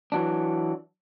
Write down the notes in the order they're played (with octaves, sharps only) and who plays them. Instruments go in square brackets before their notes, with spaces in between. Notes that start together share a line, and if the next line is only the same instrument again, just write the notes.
[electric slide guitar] E3 F#3 D4